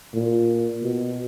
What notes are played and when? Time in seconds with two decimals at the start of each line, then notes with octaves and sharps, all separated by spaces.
0.14 A#2
0.83 B2